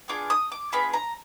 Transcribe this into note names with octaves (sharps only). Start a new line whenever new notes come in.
B3 D4 F4 G#4 D6
D#6
D6
B3 D4 F4 G#4 B5
A#5